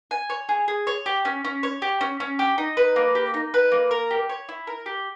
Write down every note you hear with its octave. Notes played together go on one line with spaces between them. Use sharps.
G#5
C#5
G#4
G#4
C#5
G4
C#4
C#4
C#5
G4
C#4
C#4
G4
D#4
B4
A#3
G4
D#4
B4
A#3
A#4
G4
C#5
E4
A#4
G4